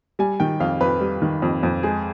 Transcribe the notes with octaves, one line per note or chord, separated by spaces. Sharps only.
G3 G#5
D#3 G5
F2 F5
F2 B4
G3
D#3
F2
F2
G#3 G#4